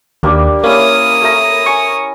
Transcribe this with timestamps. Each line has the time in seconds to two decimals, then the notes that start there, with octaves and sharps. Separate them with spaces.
0.23 D#2 G3 A#3 D4
0.64 A#3 C#4 E4 A#4 D#6
1.22 A3 A#5
1.66 G#5 C#6